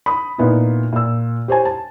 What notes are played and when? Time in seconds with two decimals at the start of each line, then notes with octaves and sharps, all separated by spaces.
0.06 B5 D#6
0.38 A#2 B3 D#4 E4
0.93 A#2 E6
1.48 G4 C5 C#5 G#5
1.65 A5